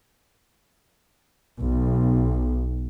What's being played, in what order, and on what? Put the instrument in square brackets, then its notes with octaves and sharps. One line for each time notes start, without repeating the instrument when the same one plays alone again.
[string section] B1